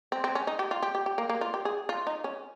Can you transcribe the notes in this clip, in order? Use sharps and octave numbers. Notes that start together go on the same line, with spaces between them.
C4
C4
C#4
D#4
G4
F4
G4
G4
G4
A#3
A#3
F4
G4
G#4
F4
D#4
C#4